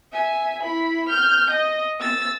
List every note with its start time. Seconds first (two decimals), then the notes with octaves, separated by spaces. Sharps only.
0.12 E5 G#5
0.63 E4 B5
1.09 F6 G6
1.50 D#5
2.01 E6 A6